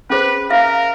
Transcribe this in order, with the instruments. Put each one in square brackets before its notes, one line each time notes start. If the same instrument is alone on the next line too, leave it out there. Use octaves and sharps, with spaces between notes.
[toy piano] C#4 G#4 C5 [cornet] B4
[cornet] A#4 [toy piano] E5 F5